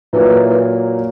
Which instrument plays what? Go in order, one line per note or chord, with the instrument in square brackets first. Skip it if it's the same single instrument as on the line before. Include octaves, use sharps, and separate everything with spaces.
[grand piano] A#2 F#3 A#3 [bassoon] E3
[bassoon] E3